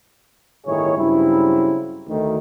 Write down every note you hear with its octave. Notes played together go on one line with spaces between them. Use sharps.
G1 A2 D#3 E4 G#4 C#5
G2 C#3 F#3 C4 E4
D2 D#3